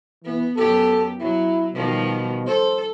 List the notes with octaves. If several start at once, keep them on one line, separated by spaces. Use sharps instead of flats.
E3 B3
F#2 B3 G4 A4
F#3 E4
B2 D#3 F3 G3
A4 C5